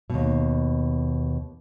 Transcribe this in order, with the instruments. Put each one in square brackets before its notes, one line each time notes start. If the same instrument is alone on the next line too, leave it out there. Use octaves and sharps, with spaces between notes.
[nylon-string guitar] D#2 B2